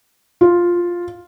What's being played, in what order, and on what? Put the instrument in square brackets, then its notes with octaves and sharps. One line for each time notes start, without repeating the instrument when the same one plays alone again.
[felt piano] F4